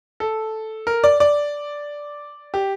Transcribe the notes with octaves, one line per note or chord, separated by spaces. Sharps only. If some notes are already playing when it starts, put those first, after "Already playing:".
A4
A#4
D5
D5
G4